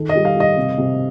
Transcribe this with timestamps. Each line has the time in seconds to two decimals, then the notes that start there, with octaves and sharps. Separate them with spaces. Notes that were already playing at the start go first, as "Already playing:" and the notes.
Already playing: D#3 A4
0.09 D#5
0.15 G3
0.25 F5
0.36 G3 D#5
0.57 C3
0.78 C3